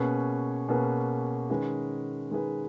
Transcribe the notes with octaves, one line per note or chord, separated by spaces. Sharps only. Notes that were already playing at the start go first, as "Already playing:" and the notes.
Already playing: B2 A#3 C#4 G#4 B4
B2 A#3 C#4 G#4 B4
D#3 G#3 C#4 G#4 B4
D#3 G#3 C#4 G#4 B4